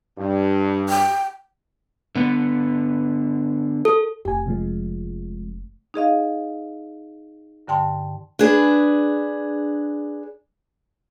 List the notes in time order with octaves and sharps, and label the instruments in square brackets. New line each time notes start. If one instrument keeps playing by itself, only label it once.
[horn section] G2
[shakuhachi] G5
[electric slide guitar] D3 B3 B4
[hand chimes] A4
[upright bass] F1 [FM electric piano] G4 G#5
[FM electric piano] C3 F3 G#3
[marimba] D#4 G#4 D#5 F5
G2 D3 G5 A5 C6
[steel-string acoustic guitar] D4 G#4 B4